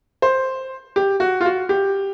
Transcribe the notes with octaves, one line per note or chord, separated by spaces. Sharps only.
C5
G4
F#4
F4
F#4
G4